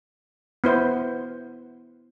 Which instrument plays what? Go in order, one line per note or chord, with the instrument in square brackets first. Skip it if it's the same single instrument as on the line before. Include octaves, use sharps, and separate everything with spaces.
[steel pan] B3 E4 C5 E5